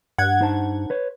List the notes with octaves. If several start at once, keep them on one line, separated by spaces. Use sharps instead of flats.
G2 F#5 G#6
D#4 C5 A5
B4 C#5